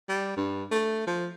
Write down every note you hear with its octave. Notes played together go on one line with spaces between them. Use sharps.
G3
G2
A3
F3